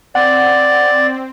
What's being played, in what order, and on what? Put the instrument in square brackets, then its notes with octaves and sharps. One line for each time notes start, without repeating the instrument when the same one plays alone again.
[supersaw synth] C4 [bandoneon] D5 [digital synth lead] F#5